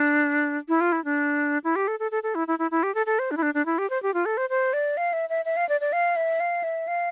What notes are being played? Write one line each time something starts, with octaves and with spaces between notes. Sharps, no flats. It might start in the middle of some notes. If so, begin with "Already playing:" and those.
Already playing: D4
E4
F4
E4
D4
E4
G4
A4
A4
A4
A4
E4
E4
E4
E4
G4
A4
A4
C5
D4
E4
D4
D4
E4
G4
C5
G4
F4
A4
C5
C5
D5
F5
E5
E5
E5
F5
D5
D5
F5
E5
F5
E5
F5